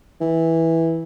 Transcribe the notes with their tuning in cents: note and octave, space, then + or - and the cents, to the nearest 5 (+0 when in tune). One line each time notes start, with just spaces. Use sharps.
E3 -10